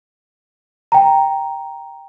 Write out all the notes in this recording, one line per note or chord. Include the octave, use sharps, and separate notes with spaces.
G5 A#5